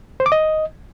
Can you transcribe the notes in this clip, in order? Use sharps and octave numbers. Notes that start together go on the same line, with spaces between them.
C5
D6
D#5